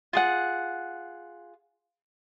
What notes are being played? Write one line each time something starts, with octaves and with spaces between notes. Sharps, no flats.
F4 G#4 F#5